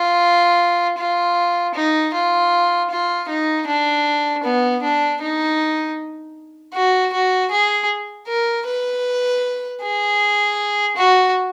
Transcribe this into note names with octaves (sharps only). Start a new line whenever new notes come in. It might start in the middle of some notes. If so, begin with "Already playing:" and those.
Already playing: F4
F4
D#4
F4
F4
D#4
D4
B3
D4
D#4
F#4
F#4
G#4
A#4
B4
G#4
F#4